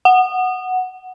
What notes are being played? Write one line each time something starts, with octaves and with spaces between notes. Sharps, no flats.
F#5